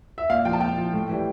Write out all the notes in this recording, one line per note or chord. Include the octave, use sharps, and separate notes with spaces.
E5
A#2 F5
F3 G5
A5
A#2 G5
F3
A2
E3 G3